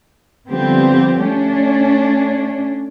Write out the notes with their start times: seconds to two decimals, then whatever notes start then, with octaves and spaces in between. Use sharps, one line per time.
0.48 D3 F3 G3 B3 C4 G4
1.25 A3 C#4 D4